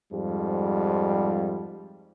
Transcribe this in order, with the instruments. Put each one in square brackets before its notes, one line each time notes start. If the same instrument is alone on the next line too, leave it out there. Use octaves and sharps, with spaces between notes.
[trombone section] F2 G#2 G3